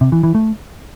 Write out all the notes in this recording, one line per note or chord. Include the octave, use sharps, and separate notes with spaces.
C3
E3
E3
A3